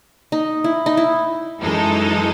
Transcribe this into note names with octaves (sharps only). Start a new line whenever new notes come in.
D#4
E4
D#4
E4
F#2 E3 G#3 D#4 A4